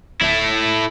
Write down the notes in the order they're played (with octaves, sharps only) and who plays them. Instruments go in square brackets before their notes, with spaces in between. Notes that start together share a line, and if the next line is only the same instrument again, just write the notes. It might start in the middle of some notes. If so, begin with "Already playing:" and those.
[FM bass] D1 [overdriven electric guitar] A3 E4